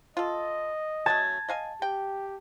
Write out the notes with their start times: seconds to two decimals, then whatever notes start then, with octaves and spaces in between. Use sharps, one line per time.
0.17 F4 A4 D#5
1.06 F#3 A3 C#4 A5 G#6
1.49 D#5 F5 G#5
1.82 G4 G5